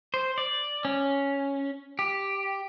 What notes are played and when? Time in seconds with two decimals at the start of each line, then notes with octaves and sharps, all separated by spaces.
0.14 C5
0.38 D5
0.85 C#4
1.99 G4